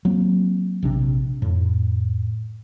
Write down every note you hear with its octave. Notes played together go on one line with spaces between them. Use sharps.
F#3 A#3 C4
A#1 C3 D4
F2 A2